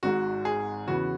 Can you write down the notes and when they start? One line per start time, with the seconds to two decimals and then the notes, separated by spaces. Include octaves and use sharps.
0.03 G#1 G#2 G#3 F#4
0.45 G#4
0.87 E2 C#3 E3 B3 F#4